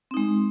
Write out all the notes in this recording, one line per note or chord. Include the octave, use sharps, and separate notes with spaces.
G#3 C4 D#4